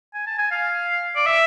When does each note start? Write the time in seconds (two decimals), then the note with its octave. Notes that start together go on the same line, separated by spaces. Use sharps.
0.14 G#5
0.27 A5
0.39 G#5
0.52 F5
1.16 D5
1.26 E5